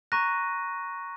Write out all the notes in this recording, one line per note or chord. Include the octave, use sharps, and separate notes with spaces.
A#5 C#6 F#6 A#6 D#7